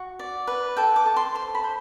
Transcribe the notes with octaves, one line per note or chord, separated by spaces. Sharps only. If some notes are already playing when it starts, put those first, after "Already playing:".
Already playing: F#4
D5
B4
A4 G5
D6
A4
C6
C5 C6
B5
C5